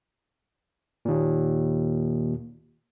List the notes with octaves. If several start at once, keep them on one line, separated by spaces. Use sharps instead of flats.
D#2 A#2